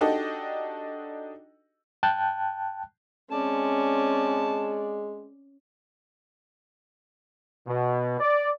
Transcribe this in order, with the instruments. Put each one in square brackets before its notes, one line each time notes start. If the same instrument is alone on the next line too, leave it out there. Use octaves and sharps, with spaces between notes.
[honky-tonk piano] D4 D#4 F#4 G4 A4 D#5
[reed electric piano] G5 A5 F#6
[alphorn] G#3 [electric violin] C4 D5 [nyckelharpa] C#4 [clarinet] A5
[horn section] B2
D5